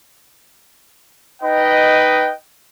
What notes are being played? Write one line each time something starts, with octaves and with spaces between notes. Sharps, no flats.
D#4 B4 D#5 G5